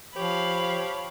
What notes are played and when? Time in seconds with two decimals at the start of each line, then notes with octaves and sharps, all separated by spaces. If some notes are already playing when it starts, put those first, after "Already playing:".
0.16 F3 G4 C#5 F5 B5